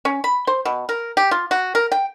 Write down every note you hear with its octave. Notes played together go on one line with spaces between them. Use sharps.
C#4
B5
C5
B2
A#4
G4
F4
F#4
A#4
G5